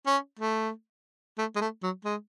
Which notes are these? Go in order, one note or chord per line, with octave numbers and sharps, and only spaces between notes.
C#4
A3
A3
G#3
A3
F#3
G#3